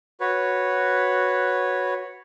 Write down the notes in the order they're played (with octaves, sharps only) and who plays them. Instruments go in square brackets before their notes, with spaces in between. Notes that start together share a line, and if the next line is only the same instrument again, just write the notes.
[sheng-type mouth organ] F#4 B4 C#5